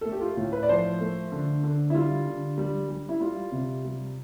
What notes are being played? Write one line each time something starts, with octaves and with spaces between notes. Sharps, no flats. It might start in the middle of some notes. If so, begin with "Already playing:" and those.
A3 A4
G4
F4
A2
B4
D5
F3 C5
A3
D3
D3
E4
G3 F4
D3
G3
G3
E4
G3 F4
C3
G3